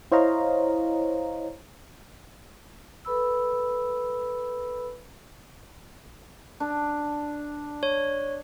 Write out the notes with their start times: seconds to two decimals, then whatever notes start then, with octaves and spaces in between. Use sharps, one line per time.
0.12 E4 C5 C#5 D#5 F5 A#5
3.05 A4 B4 B5 E6
6.60 D4
7.83 C#5